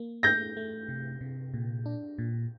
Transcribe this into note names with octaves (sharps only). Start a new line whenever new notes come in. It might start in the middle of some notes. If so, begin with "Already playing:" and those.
Already playing: A#3
A3 G6 A#6
A3
C3
C3
A#2
D4
A#2